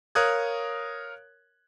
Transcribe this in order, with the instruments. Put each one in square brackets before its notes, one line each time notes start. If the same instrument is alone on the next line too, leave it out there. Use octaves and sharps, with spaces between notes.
[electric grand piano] A#4 C#5 F5 D#6 F#6 G#6